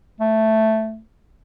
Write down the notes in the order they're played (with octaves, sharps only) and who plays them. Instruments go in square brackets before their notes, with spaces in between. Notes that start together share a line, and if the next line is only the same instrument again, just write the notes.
[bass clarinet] A3